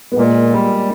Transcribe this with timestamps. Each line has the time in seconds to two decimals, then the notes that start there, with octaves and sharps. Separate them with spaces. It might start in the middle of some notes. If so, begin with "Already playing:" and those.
0.12 B3
0.17 A#2 G#3 A#3
0.53 G3